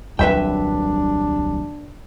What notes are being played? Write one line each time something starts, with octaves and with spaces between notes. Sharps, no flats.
D#1 C2 F#3 D4 B4 E5 G5